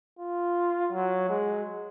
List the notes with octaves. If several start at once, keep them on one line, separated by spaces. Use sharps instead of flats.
F4
F#3
G#3